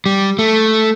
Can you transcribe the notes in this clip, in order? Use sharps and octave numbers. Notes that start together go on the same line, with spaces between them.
G3
A3